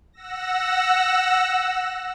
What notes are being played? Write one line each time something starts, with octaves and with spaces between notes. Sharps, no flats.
F#5 E6 A#6